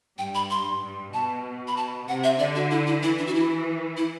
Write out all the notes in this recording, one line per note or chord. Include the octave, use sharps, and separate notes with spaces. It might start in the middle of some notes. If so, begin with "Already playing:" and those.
G2 G5
B5
C6
G2
B2 A5
B5
A5
C3 F#5
E5
D3 D5
F#4
E4
E4
E3 E4
D4
F#4
E4
E4